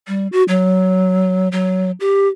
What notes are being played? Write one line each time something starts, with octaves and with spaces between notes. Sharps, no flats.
G3
F#4
F#3
F#3
G4